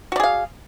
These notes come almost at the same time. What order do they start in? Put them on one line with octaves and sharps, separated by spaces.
F#4 D5 G#4 F5